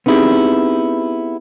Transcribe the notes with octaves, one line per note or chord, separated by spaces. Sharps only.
B3 C4 D#4 E4 G4 G#4